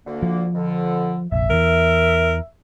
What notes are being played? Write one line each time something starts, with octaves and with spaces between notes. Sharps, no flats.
D2 D3 A#3
F3
F2 D3
F1 A#1 E5
E2 E3 A#4